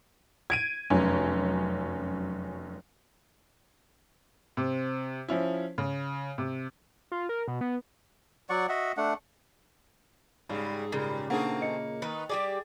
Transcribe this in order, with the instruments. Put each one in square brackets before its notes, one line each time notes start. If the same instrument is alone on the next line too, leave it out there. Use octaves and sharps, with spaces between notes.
[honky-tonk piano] G#6 D7 D#7
F1 F#2 C#4
[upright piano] C3 C4
F3 C#4 E4
C#3
C3
[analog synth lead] F4
A#4
B2
B3
[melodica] F#3 D5 F#5 C#6
F#4 D#5 E5 F#5
A3 D4 F#5
[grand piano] G#2 [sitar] C#3 G3
[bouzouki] A#2 C#3 [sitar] G3
[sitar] A3 C4 G#4 [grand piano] A#3 [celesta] D4 D#4 F#5
[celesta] D#5 C#7
[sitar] D#3 [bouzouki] D#4 B4
[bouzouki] G3 G4 D5 [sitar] G#4